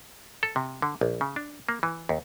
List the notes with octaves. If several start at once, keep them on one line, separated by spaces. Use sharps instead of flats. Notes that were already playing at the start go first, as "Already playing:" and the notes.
A4
C3
D3
A#1
C#3
D4
A#3
E3
D#2